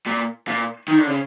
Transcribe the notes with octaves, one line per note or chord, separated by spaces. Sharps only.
A#2
A#2
D#3
D3
C#3